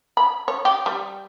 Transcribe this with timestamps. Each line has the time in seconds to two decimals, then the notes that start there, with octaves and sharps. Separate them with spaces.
0.17 B5
0.48 C#5
0.65 G4
0.86 G3